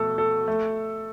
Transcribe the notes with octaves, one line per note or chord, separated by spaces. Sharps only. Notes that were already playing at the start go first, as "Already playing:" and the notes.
Already playing: B2 A3 A4
A4
A3